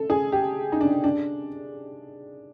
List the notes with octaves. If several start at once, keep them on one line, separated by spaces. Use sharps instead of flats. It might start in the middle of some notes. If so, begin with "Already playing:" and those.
Already playing: A4
G#4
G4
D#4
D4
D4